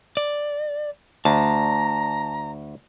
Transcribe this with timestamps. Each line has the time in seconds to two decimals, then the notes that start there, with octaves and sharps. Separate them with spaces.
0.17 D5
1.25 D2 A5 A#5